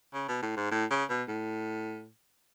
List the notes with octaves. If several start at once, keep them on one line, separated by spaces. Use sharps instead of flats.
C#3
B2
A2
G#2
A2
C#3
B2
A2